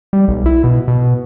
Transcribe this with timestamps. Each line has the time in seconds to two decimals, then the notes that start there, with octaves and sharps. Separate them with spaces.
0.13 G3
0.28 B1
0.46 E4
0.64 B2
0.88 B2